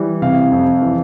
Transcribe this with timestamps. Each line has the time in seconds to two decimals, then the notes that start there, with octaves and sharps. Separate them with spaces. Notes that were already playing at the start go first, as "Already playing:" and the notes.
Already playing: E3 G3
0.22 C3 F5
0.51 F2
0.82 E3